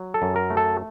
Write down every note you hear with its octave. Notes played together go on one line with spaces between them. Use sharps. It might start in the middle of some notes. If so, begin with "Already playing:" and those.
Already playing: F#3
A4
F#2
A#4
A3
A4